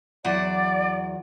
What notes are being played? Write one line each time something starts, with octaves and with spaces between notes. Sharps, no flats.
E2 F#3 D5 F#5